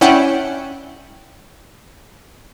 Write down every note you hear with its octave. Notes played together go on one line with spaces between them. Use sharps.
C#4 D4 E4 F#5 G5